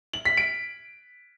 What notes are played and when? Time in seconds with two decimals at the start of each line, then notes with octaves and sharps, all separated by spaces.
0.13 F#7
0.25 B6
0.37 D7